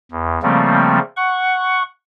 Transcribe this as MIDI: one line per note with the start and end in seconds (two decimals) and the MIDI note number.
0.11 0.39 40
0.42 0.99 49
0.42 0.99 53
0.42 0.99 55
0.42 0.99 57
0.42 0.99 58
0.42 0.99 60
1.16 1.83 78
1.16 1.83 85